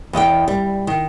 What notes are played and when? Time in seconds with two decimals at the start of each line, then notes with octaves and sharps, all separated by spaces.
0.13 E2 D#5 F#5 G5
0.48 G3
0.87 D#3